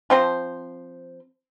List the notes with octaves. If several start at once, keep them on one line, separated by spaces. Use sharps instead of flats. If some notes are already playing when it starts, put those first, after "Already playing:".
F3 C4 C5